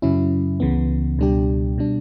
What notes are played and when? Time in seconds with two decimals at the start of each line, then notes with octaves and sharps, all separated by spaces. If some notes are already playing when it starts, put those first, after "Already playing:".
0.02 F#2 C#3 F#3 C#4 E4
0.60 C#2 C#3 E3 B3
1.19 C#2 B2 G3 D4 G4
1.78 B2 G3 D4